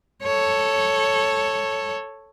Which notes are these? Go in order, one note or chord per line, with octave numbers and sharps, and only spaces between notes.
A4 C#5